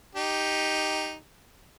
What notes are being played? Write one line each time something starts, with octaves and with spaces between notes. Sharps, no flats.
D#4 G4